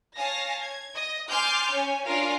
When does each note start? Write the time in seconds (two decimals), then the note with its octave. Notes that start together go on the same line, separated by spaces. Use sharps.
0.16 C#5 F5 G#5 A5 A#6
0.62 G#6
0.95 D#5
1.30 G#5 C6 D6 F6 G6 A6
1.72 C#4 C#5 G#5
2.07 D4 F4 A#4 C#5 F5 G#5